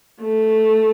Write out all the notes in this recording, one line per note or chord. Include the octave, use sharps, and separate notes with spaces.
A3